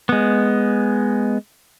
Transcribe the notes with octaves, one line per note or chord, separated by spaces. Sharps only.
G#3 B3